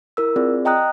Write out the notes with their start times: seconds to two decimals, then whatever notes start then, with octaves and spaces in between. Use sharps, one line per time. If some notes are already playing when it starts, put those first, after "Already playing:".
0.17 E4 A#4 E6
0.36 C4 F4 G#4 D5
0.65 D#5 G5 A#5 D#6 F#6